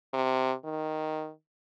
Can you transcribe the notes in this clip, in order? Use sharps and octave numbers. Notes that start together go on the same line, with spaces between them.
C3
D#3